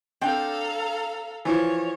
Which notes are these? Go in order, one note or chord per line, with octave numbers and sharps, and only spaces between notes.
C4 D4 A4 F5 G5 A#5
E3 F3 C#5